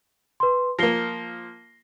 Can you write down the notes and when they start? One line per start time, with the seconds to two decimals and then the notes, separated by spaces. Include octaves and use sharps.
0.40 B4 C6
0.79 F3 A#3 A#6 C7 G7